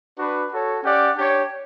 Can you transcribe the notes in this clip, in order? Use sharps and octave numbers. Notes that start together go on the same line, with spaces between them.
D4 F#4 B4
F#4 A4 C#5
C#4 G4 D5 F#5
D4 G4 C#5